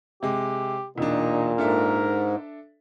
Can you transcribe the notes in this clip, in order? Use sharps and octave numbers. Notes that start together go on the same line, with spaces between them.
C3 G#3 G4
E1 A#2 D4 D#4
G#2 D4 A4 A#4 E5